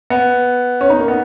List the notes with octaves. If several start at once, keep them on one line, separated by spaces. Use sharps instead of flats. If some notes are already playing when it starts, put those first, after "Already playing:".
B3
C#4
D#4
A#3
B3